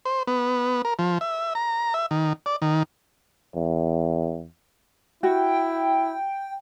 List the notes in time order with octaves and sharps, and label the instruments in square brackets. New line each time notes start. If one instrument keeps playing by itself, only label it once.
[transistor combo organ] C5
B3
A#4
F3
E5
A#5
E5
D#3
D5
D#3
[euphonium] E2
[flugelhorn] E4 [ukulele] F#4 [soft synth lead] G5